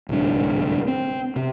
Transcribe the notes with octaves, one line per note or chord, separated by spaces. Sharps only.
D1 C2 G#2 D4
C4
C3